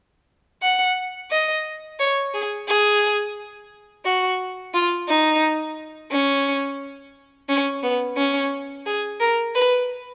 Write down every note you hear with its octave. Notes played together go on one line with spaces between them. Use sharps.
F#5
D#5
C#5
G#4
G#4
F#4
F4
D#4
C#4
C#4
B3
C#4
G#4
A#4
B4